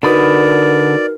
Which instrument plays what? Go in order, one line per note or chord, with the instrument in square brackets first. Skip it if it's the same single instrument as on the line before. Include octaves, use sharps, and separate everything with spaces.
[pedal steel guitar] D3 B5 D#6 [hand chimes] D#4 F#4 B4 [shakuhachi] A#4 [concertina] D5